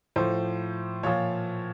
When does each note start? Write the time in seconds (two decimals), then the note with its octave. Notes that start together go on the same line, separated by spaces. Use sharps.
0.16 A2 F3 C5
1.03 A#2 F3 C#5